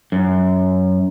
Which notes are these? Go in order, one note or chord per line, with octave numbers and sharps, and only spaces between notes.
F#2